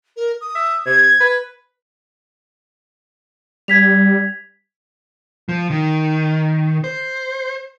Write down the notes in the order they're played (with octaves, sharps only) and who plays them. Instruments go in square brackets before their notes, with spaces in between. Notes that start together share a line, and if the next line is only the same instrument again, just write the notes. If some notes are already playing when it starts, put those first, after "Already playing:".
[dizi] A#4
D#6
[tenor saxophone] E5
[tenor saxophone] C3 [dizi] G#6
[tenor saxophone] B4
[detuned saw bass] G3 [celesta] G#6 B6 F7
[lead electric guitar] F3
D#3
C5